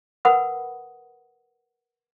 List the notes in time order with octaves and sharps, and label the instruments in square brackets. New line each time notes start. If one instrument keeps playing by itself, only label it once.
[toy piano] A#4 B4 F#5 B5 D#6